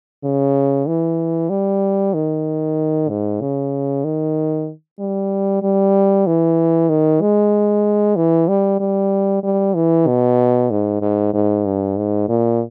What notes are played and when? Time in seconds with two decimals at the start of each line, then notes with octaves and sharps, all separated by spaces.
0.24 C#3
0.88 E3
1.50 G3
2.14 D#3
3.09 G#2
3.41 C#3
4.04 D#3
5.00 G3
5.63 G3
6.27 E3
6.89 D#3
7.21 G#3
8.16 E3
8.48 G3
8.80 G3
9.43 G3
9.75 E3
10.07 B2
10.71 G#2
11.02 G#2
11.34 G#2
11.66 G2
11.97 G#2
12.29 A#2